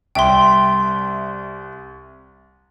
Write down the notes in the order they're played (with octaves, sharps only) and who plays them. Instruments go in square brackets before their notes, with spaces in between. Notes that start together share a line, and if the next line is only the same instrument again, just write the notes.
[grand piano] C2 E5 [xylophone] G5 C6